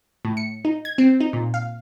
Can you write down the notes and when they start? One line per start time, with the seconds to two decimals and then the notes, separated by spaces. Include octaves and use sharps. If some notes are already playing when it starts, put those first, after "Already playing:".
0.25 A2
0.37 C#7
0.65 D#4
0.85 G#6
0.98 C4
1.20 D#4
1.33 A#2
1.54 F5